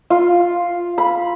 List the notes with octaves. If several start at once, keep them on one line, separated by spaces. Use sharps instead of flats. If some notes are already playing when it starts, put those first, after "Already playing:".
F4
B5